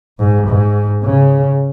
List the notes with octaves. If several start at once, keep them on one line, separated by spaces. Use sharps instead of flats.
G#2
G#2
C#3